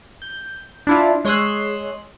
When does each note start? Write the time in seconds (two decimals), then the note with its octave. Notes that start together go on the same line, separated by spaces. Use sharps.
0.22 G6
0.87 D4 E4 F4
1.25 G#3 C#5 C6 D#6 E6 F#6